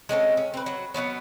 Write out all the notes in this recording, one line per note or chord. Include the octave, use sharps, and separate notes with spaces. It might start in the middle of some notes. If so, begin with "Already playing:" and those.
G#3 C4 C#4 A4
C#4
C4 B4
F#3 F#4
F#3 G3 B3 C#4